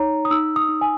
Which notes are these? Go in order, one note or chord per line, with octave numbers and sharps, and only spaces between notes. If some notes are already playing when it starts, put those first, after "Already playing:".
Already playing: D#4 C#5 A#5
D#6
D#4 E6
D#6
D#4
G#5